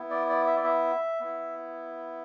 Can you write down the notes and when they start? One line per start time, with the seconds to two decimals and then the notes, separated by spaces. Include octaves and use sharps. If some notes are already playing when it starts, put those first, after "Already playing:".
Already playing: B3 E4
0.11 D5
0.29 D5
0.47 E5
0.56 D5
0.64 E5
1.20 B3 E4